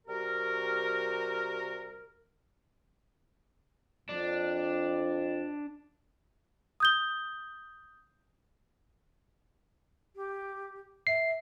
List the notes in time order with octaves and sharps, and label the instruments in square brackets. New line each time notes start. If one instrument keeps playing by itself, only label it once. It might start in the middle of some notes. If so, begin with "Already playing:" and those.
[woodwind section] C3 G3 F#4 G4 A#4
[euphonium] F2 [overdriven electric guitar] D4
[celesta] D#6 G6 G7
[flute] G4
[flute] E5 [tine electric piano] C7